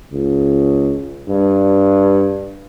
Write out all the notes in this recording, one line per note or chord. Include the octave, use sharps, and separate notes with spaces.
C#2
G2